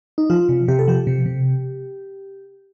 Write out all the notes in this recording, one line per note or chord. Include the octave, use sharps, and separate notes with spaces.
D#4
F3 F4
C3
C3 G4
A4
F3 G4
C3
C3